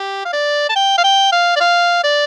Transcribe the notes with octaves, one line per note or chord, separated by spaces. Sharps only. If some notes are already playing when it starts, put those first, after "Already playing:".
Already playing: G4
F5
D5
A5
G5
F5
G5
F5
D5
F5
D5